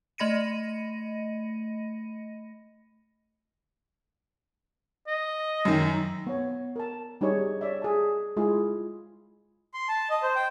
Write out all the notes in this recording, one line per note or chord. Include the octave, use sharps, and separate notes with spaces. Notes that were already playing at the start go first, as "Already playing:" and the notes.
A3 D#5 B5 A#6 C#7 D#7
D#5
F#2 D#3
B3 C#5
A#4 A5
G3 D4 D#4 G4 G#4 C#5
C#5 D5 E5
G#4 A5
G#3 E4 F4 G#4
C6
A5
D#5
C5
G5